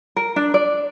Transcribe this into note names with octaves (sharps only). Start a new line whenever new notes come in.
A#4
D4
D5